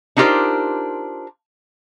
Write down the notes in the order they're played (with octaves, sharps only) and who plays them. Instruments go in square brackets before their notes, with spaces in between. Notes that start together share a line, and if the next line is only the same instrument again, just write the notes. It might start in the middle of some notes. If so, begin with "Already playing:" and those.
[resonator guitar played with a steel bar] D4 D#4 F4 G4 A#4 C5